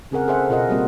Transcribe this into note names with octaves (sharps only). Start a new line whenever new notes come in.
C#3 C4 G#4 A#4 F#5
G#4 A4 C5 E5 F#5
B2 F4 G#4 A#4 D#5 F#5
G3 A#3 C4 F#4